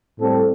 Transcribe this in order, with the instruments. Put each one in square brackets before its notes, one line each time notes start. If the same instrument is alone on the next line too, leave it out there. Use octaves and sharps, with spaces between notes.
[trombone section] A2 G3 C4 A4